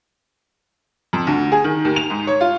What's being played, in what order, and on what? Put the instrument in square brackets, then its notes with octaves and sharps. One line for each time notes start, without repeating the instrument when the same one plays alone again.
[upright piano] F2
D2
G#4
D#3
D#2
F7
G#2
C#5
F4